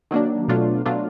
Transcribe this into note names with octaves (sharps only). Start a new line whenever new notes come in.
D#3 F#3 A#3 D4
B2 F#3 A3 D4 F4
B2 F#3 A3 D4 F4